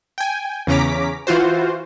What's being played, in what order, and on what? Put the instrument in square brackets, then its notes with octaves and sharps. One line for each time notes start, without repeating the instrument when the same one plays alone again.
[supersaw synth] G5 G#5
E2 C#3 C#4 A#5 D6 B6
E3 F4 F#4 C5